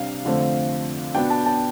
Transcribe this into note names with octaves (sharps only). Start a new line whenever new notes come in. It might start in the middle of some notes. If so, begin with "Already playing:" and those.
Already playing: C3 G3 D4 F5
F2 D3 A3 C4
B2 B3 D4 G5
A5
A5